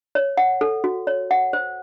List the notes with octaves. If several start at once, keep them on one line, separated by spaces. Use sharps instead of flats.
C#5
F#5
A4
F#4
C#5
F#5
C5